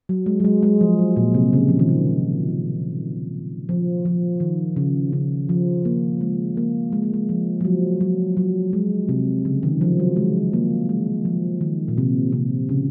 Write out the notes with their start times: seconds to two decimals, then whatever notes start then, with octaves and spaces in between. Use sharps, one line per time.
0.09 F#3
0.26 G#3
0.40 F#3
0.44 G#3
0.63 G#3
0.81 F3
0.99 F#3
1.16 A#2
1.34 C3
1.53 C#3
1.68 F3
1.79 D#3
1.89 C#3
3.69 F3
4.05 F3
4.40 D#3
4.76 C#3
5.13 C#3
5.49 F3
5.85 A#3
6.21 G#3
6.57 A#3
6.92 G#3
7.03 A#3
7.14 G#3
7.29 F3
7.60 F3
7.65 F#3
8.01 F#3
8.37 F#3
8.73 G#3
9.09 C3
9.45 C#3
9.63 D#3
9.81 F3
9.99 F#3
10.16 G#3
10.53 A#3
10.89 G#3
11.25 F3
11.61 D#3
11.88 A#2
11.98 C3
12.32 C3
12.69 C#3